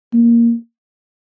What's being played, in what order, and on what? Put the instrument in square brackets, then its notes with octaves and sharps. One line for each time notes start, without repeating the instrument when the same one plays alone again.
[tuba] A#3